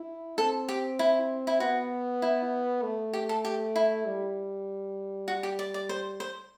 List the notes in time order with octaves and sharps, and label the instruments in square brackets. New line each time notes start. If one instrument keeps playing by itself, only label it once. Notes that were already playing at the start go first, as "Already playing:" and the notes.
Already playing: [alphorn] E4
[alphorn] C4 [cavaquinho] A4
[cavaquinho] G4
E4
E4
[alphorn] B3 [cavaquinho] F#4
[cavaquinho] E4
[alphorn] A3
[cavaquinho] G4
A4
G4
E4
[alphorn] G3
[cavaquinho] F#4
G4
D5
D5
C5
C5